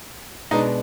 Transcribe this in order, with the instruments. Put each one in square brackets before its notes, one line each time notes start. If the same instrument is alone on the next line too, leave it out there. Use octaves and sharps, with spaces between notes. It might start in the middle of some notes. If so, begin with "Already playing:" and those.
[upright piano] B2 G#3 B3 D4 [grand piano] D#4